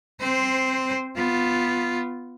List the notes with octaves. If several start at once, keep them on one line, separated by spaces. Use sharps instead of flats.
C4 C5
B3 F4